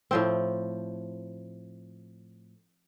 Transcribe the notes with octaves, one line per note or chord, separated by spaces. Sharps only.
A2 F3 C4